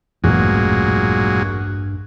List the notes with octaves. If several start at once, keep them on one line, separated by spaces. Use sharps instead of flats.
A1 E2 G2 A#2 F#3 G#3